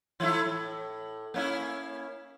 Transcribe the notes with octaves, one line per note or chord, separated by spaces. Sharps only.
E3 A3 E4
A2
A#3 C#4 E4